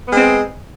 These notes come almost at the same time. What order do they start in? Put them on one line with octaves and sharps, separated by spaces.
B3 G#3 C4